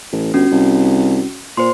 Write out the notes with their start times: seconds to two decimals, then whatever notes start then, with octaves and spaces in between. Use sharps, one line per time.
0.12 A1
0.34 G1 C#4 F#4
0.51 C2
1.57 A#2 C5 C6